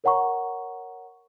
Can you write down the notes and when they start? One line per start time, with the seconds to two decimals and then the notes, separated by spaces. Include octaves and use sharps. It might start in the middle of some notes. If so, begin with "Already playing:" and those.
0.04 A#4 C#5 F#5 A#5 C#6